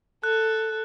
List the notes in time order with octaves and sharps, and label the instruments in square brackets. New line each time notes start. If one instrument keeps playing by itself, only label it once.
[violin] A4 [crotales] F#6